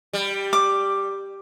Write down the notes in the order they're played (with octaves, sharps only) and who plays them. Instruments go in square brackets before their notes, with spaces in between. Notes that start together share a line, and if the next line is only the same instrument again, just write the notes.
[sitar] G3
[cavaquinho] D6